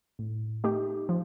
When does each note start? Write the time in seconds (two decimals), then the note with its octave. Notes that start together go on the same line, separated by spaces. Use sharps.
0.19 A2
0.64 A3 D#4 G4
1.09 F3